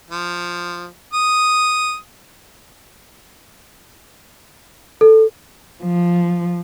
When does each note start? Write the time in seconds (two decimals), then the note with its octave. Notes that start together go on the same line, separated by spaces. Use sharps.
0.11 F3
1.13 D#6
5.01 A4
5.82 F3